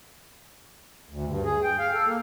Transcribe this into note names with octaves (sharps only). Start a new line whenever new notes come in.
D2
G2
G#4
G5
F5
A4
A#3